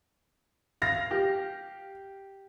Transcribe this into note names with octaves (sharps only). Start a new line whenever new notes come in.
F5 A#6
G4